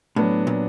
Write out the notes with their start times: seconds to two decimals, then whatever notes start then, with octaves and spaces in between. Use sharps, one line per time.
0.16 A2 F#3 B3 D4
0.47 A#2